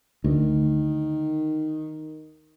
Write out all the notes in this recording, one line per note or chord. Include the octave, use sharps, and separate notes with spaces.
D2 D#3